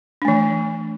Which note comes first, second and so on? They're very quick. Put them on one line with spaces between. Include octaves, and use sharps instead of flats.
D4 A3 E3